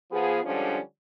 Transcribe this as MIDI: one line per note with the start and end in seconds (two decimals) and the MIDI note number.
0.12 0.40 53
0.12 0.40 59
0.12 0.40 68
0.45 0.78 50
0.45 0.78 53
0.45 0.78 55
0.45 0.78 56
0.45 0.78 61
0.45 0.78 62